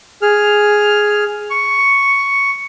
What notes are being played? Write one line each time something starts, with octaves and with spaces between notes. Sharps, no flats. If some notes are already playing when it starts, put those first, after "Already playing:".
G#4 F6
C#6